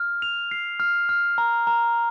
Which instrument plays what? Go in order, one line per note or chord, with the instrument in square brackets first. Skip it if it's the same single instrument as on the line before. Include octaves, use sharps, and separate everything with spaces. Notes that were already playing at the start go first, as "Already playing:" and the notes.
Already playing: [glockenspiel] F6
F7
C7
F6
F6
A#5
A#5